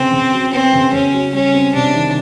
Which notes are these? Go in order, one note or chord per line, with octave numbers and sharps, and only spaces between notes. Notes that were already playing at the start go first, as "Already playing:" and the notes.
Already playing: C#3 B3 C4
C#3
F#3
B3 C4
C#3
C#3 C#4
F#3
G3 C#4
C4
C3 D4
D#3